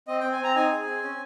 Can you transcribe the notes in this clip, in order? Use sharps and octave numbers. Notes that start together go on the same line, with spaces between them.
C4 D#5
G5
C4
G#5
C4 A#5
D#4 G#5
G#4
C4
C#4